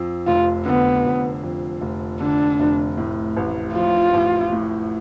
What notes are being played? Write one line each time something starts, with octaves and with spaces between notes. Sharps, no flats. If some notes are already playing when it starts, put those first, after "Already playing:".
Already playing: F2
F1 F4
D3 B3
F1
F2
F1
D3 D4
F1
A2
A1
F3 F4
A1
A2